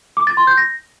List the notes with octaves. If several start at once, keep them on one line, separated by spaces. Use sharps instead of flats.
D6
A6
C6
G6
A#6